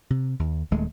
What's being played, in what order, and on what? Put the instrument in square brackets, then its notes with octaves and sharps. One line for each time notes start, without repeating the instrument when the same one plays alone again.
[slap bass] C3
D#2
D#1 D#2 G#3 A3